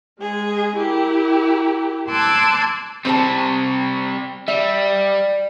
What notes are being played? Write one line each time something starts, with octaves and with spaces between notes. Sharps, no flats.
G#3 G#4
E4 G4 A#4
A5 C6 D6 E6 F#6 G#6
C3 G3 C4 C5 A5
G3 D5 E5